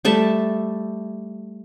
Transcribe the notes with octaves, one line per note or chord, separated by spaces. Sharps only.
G3 A3 E5 A5